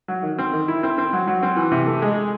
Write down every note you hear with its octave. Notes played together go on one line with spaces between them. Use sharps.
F#3
D#3
C4
D#3
E4
C4
C4
F#3
F#3
C4
E3
C3
A3
G#3